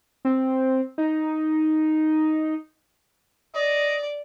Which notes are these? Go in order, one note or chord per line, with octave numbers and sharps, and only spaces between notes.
C4
D#4
D5 D#5